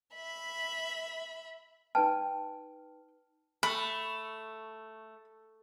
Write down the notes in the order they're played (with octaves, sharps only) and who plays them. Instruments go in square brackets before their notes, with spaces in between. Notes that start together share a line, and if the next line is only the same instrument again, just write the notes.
[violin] E5 B5
[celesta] D#4 B4 F6 [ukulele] G5 [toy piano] A5
[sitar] A3 [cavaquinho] B5